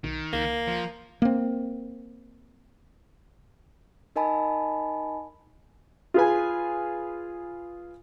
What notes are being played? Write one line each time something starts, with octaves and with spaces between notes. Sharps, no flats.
B1 D#3
C#2 A#3
F3
A#3 C4
D#4 A#4 D#5 G#5 A5 B5
F4 G#4 B4 G#5